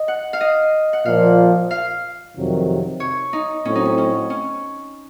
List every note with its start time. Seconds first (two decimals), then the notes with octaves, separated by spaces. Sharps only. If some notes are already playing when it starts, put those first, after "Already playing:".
Already playing: D#5
0.08 F#5
0.33 F5
0.41 D#5
0.93 F#5
1.05 A#2 F3 A#3 F5
1.71 F5
2.36 F2 C3 D#3 F#3
3.00 C#5
3.33 D#4
3.65 A2 F#3 C4 C#4
3.75 D#4
3.85 C#4
3.98 C#4
4.30 C#4